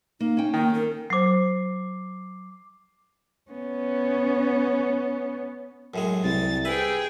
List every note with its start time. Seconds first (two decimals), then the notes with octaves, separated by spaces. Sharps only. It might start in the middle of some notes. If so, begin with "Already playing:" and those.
0.20 A#3 D#4
0.37 C#4 G5
0.54 D#3 A#3
0.74 A#4
1.10 F#3 C5 D6 C7
3.51 B3 C#4
5.94 F#2 A2 G#3
6.24 C2 A6
6.65 G#4 B4 E5 G5